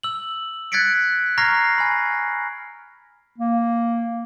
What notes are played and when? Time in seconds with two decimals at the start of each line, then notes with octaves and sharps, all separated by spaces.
0.03 E6 F#7
0.72 F#6 G#6 A6 B6 C#7 D7
1.38 A#5 C#6 F6 G#6 A#6 C7
1.78 G#5 B5
3.39 A#3